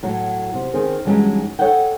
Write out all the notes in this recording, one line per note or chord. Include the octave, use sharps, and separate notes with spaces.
A2 F#3
C3
D#3 C4 C#4 G#4
G2 E3 F#3 G#3 C#4 D#4
A4 C#5 D#5 E5 F#5 G5